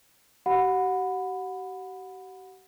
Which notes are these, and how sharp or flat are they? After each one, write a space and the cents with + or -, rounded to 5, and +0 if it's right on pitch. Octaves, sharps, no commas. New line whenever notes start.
G4 -45 F#5 -20 B5 +10